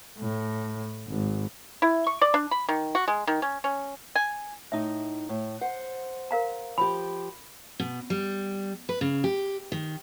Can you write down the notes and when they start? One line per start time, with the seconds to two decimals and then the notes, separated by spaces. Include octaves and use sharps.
0.19 A2
1.08 G#1
1.82 E4
2.07 C#6
2.21 D5
2.34 D4
2.51 B5
2.69 D#3
2.95 F#4
3.08 G#3
3.27 D#3
3.42 C#4
3.64 C#4
4.15 G#5
4.72 A2 D#4 E5
5.29 A2
5.61 C5 F#5
6.31 A#4 F5 A#5
6.78 F3 G4 B5
7.80 B2
8.10 G3
8.89 B4
9.01 C#3
9.24 G4
9.72 D#3